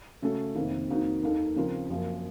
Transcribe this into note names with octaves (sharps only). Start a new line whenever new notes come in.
C#3 A3 C#4 F#4 A4
F2 C3 D#3 A#3
F2 D#3 A#3 D#4 F#4
D#2 D#3 A#3 D#4 A4
C#3 F3 C4 F4 A#4
F#2 F3 A#3